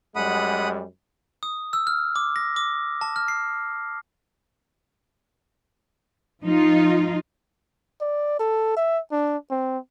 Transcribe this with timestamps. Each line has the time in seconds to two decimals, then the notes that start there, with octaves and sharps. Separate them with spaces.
0.16 F#2 G3 G#3 F#5 B5 D#6
1.43 D#6
1.73 E6
1.87 F6
2.16 D6
2.36 A#6
2.56 D6
3.01 A5
3.16 F6
3.28 C7
6.43 F3 D#4 F4
8.01 D5
8.39 A4
8.77 E5
9.12 D4
9.51 C4